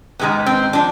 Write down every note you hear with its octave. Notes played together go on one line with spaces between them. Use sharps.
G#2 D#3 G#3 B3
C4
F3 D4